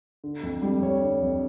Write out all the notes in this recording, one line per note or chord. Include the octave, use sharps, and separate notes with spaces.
D3
F2
G3
F2 C#5
D3
F2